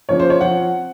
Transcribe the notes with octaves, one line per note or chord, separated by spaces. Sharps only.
C#3 F3 A#3 C#5
C5
C#5
F3 C4 F#5